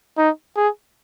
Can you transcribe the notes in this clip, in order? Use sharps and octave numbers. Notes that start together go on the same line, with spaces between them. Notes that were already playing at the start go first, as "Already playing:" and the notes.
D#4
G#4